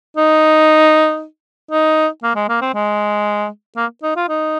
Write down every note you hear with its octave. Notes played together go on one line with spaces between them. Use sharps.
D#4
D#4
A#3
G#3
A#3
C4
G#3
A#3
D#4
F4
D#4